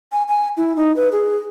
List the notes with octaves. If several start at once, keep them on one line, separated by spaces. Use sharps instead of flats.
G#5
G#5
E4
D#4
B4
G#4